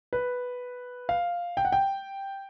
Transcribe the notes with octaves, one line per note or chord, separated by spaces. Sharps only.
B4
F5
G5
F#5
G5